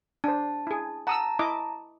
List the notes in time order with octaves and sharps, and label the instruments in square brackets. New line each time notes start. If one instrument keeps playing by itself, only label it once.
[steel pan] D4 C5 [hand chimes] A5
[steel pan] E4 G#4
[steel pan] F#5 D#6 E6 [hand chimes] A5 A#5
[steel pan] E4 D#5 D6